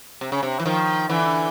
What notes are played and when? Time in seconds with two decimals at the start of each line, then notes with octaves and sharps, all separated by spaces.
0.21 C3
0.32 C#3
0.43 C3
0.60 E3
0.65 D#3 F3
1.10 D3 E3